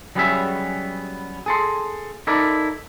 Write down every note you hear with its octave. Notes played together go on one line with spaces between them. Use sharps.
F#3 G3 B3 C#4 G#4 E5
G#4 A4 C6
D#4 E4 A4 A#4 D5